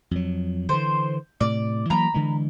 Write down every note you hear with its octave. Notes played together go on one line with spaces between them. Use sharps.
F2 F#3
D3 E3 C5
A2 C3 D5
E3 F#3 A#3 A#5 B5
D3 E3 G#3